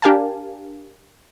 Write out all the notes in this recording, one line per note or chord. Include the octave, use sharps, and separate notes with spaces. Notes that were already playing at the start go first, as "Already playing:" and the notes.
D4 G4 A#4 F5 G#5 A5